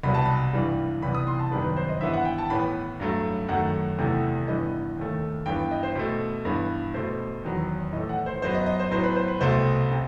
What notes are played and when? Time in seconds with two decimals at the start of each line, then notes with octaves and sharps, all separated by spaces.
0.03 C2 B2 G3 B3 B5
0.14 A5
0.25 B5
0.53 G2 E3 G3
1.02 C2 C3 E3 G3 B3 B5
1.15 D#6
1.27 C6
1.39 A5
1.52 F#2 D#3 G3 B3 B4
1.64 B4
1.77 C5
1.89 D#5
2.01 G2 E3 B3 E5
2.13 F#5
2.25 G5
2.38 A5
2.50 A2 E3 B3 B5
3.00 G2 F#3 A3
3.49 F#2 D#3 A3 F#5
3.98 E2 C3 E3 A3
4.48 G2 E3 G3 B3 D#5
4.97 D#2 D#3 A3
5.46 G2 E3 B3 G5
5.71 D#5
5.83 C5
5.96 B2 A3
6.45 G2 E3 B3
6.94 B2 A3 C5
7.44 E2 D#3 F#3 B3
7.92 A2 E3 A3 D#5
8.09 F#5
8.26 C5
8.42 F#2 F#3 B3 C5
8.55 D#5
8.66 D#5
8.79 C5
8.91 A2 F#3 B3 C5
9.04 B4
9.16 C5
9.28 B4
9.41 C2 B2 A3 C5
9.91 C3